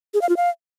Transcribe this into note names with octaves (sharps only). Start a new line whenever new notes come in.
G#4
F5
F4
F5